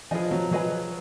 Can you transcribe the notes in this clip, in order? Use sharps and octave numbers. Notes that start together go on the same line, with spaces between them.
F3 G#4 B4 D#5 G#5
F#3
F#3 G#4 B4 D#5 G#5